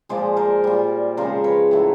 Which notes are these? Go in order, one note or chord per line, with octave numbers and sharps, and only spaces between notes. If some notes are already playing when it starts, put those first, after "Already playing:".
A#2 F3 G#3 C5 D5
A#4 C5
A#2 G3
C#3 F3 G#3 A#4 C5
B4 C#5
A2 F#3 A3